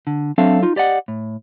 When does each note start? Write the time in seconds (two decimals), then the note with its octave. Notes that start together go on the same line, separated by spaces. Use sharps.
0.07 D3
0.38 F#3 C4 D4 A4 E5 F5
0.63 D#4 F4
0.76 G4 D5 D#5 F#5
1.08 A2